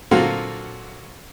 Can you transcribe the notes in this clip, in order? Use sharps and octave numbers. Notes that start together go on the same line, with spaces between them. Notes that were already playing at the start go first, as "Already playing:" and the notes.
A#2 D3 F#3 C4 F4 F#4